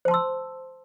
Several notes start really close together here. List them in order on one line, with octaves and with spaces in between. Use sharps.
C5 A5 C6 E6